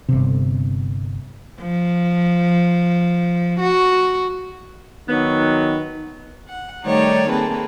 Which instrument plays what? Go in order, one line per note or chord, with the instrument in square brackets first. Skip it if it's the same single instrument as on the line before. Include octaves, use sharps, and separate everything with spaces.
[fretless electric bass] G1 C3
[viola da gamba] F3
F#4
[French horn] D#3 [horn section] F#3 B3
[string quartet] F#5
D#3 G3 A3 D#4 C#5 D5
A#3 C4 G#4 A4 B4